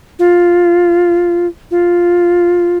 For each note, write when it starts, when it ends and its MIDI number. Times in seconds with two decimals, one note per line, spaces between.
0.19 1.46 65
1.71 2.78 65